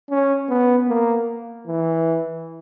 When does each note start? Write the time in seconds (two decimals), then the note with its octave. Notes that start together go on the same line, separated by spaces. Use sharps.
0.10 C#4
0.49 B3
0.88 A#3
1.67 E3